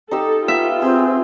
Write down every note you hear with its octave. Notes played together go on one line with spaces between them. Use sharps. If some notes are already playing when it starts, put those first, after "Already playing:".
D#4 G4 A4 E6
B3 F4 E5
C4 G#4